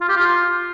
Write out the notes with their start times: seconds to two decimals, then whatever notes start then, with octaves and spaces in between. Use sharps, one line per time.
0.01 F4
0.09 G4
0.17 F4